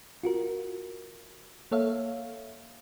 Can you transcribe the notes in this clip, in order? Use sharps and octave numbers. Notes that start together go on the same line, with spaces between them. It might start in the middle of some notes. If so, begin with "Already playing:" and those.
F4 F#4 A#4
A#3 A4 C#5 E5 F5